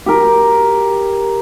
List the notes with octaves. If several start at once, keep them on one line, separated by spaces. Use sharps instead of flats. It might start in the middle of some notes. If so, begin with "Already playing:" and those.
G4 A#4